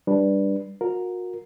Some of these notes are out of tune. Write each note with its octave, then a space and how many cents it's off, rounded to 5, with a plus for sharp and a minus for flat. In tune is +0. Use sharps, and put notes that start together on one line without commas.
G3 +0 D4 +0 B4 -15
F#4 -35 A#4 +0